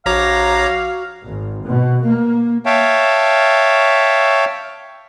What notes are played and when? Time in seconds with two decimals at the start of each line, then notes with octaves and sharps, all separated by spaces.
0.06 A#1 F#4 C#5 F5 A#5 D6
1.24 G#1
1.66 B2
2.05 A#3
2.66 C#5 E5 F5 G5 A5